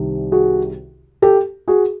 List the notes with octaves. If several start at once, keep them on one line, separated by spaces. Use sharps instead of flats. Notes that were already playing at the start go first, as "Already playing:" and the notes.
Already playing: C2 C3 D#3 G3
F#4 G#4
G4 A4
F#4 G#4